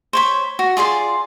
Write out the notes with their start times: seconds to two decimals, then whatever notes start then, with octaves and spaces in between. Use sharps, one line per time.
0.13 C5 C#5 B5
0.59 F#4
0.77 F4 G#4 D5 C6